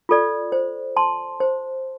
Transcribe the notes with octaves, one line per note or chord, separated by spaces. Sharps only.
F4 A4 D5
C5
A5 C6
C5